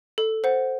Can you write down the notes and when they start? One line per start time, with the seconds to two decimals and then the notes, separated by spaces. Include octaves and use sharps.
0.18 A4
0.44 C5 F#5